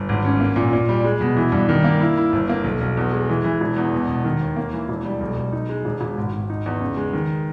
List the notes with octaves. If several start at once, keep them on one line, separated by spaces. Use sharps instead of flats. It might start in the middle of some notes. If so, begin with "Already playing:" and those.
Already playing: G1
G#1
C#4
A#3
A#2
A#2
G3
G#3
B2
E3
G2
D#3
A#3
E4
E4
G1
A#3
B1
B1
E2
G#3
E3
E3
E1
E2
B2
B2
D#3
D#2
A#3
E3
E1
G3
B1
B1
D#4
G#3
E1
E1
G#1
G#1
D#4
E2
C#3
G#3
D#3